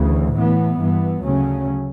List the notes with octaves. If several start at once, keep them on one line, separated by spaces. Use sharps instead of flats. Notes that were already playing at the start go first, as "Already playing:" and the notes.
Already playing: D2 C#3 E3
A2 E3 B3
G2 E3 B3
D2 C#3 F#3 A3 C#4